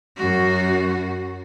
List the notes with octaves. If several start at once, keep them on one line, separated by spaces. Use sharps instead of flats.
F#2 F#4